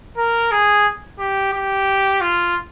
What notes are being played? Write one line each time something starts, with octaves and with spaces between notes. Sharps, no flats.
A#4
G#4
G4
G4
F4